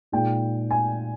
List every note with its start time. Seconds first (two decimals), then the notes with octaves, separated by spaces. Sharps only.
0.12 A#2 G#3 D#4 G5
0.71 G#5